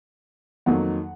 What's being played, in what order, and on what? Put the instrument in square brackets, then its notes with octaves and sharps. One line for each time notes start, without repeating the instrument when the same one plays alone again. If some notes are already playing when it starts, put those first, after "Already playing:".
[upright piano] F2 D#3 F#3 A#3 D#4 F#5